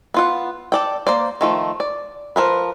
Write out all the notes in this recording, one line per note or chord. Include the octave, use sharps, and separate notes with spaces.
B3 F4 F#5
A4 D5 G5
A#3 C5 D5
D#3 F3 A3
D5
F3 A#4 B4